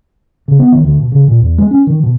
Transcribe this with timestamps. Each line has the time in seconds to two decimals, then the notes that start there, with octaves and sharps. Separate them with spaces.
0.48 C#3
0.59 B3
0.72 D#3
0.84 D2
0.99 B2
1.12 C#3
1.28 A#2
1.40 E2
1.58 G#3
1.71 C#4
1.87 D#3
2.03 B2